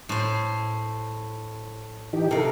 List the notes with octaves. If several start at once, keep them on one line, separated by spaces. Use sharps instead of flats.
A2 C5
E3 D#4 G4
C3 A4 A#4 F5